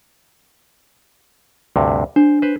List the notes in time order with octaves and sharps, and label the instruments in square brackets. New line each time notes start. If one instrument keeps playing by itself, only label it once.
[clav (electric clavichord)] D2 G2 C3
[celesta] D4 [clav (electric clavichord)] C5
[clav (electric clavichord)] B4 C5